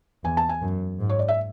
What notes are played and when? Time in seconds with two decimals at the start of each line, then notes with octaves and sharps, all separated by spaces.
0.24 E2 G#5
0.37 A5
0.49 G#5
0.62 F#2
1.00 G#2
1.10 C#5
1.19 D5
1.28 E5